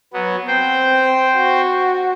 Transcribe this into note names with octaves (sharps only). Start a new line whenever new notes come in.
F#3 B3
C4 C5 G5
F#4